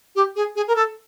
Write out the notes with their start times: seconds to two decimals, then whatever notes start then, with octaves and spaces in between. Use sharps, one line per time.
0.15 G4
0.36 G#4
0.56 G#4
0.67 A#4
0.76 A4